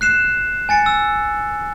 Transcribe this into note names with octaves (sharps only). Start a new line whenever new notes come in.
F#6 C7 E7
G#5 A6 C#7
E6